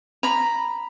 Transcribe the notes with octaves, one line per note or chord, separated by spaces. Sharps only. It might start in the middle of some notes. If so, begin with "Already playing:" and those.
A#5 B5